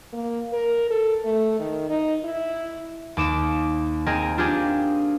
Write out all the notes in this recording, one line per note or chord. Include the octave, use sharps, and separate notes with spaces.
A#3
A#4
A4
A3
D#3
D#4
E4
D#2 D6 E7
C4 G#4 A#4 D#5
D4 F4 G4 G#4